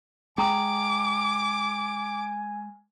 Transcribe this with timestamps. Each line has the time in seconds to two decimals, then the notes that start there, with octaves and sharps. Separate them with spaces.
0.38 G#3 G5 G#5 A#5 D6 D#6